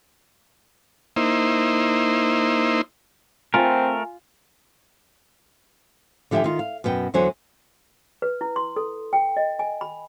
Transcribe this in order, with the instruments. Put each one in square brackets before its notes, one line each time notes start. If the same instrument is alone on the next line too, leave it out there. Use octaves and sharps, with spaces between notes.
[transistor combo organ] A#3 D#4 E4 C5
[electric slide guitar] A3 A#4 [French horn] C4 [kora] F4 [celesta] G#5
[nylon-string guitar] D3 F3 G4 E5 G5 G#5
D#3 F4
F5
F#2 B2 B3 G5
E2 D3 F#3 C5 G#5
[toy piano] B4
E4
C6
A4
G5
D#5
G#5
B5